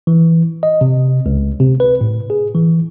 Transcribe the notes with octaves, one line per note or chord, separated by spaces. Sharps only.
E3
D#5
C3
C#2
C3
B4
A2
G#4
E3